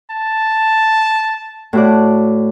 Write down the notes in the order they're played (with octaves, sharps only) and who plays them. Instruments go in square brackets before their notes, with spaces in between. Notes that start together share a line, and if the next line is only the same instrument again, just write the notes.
[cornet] A5
[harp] A2 F#4 D5